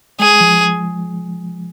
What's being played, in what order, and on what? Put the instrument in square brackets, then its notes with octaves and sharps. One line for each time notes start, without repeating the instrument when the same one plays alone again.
[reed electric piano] G#3 [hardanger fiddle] G#4
[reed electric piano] F3